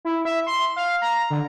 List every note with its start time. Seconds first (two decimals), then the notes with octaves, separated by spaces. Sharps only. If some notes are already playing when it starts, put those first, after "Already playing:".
0.05 E4
0.25 E5
0.47 C6
0.76 F5
1.02 A#5
1.30 D3